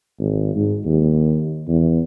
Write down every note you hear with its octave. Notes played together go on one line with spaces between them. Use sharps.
G#1
G#2
D#2
E2